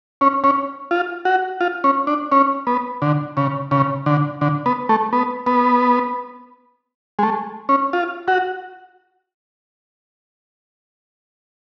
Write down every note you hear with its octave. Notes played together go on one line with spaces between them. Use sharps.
C#4
C#4
F4
F#4
F4
C#4
D4
C#4
B3
D3
C#3
C#3
D3
D3
B3
A3
B3
B3
G#3
A3
C#4
F4
F#4